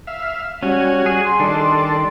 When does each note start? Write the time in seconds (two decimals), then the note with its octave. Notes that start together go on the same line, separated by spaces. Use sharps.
0.07 E5 F5
0.63 G3 C#4 F#4 G#5
1.06 G#4 F#6
1.24 C6
1.40 D#3 G3 D4 A4